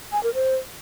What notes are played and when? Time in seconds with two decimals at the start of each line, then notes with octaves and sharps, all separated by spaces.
0.12 G#5
0.23 A#4
0.34 C5